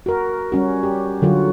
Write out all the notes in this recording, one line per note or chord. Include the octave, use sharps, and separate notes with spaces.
F#4 A#4
G3 C#4 F#4
G4
D3 F#3 F4 F#4